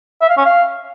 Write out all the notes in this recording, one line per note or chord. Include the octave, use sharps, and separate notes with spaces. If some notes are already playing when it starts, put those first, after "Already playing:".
E5
F5
C#4
F5